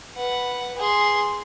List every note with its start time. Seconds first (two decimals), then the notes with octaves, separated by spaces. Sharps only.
0.16 B4 F#5
0.77 G#4 C6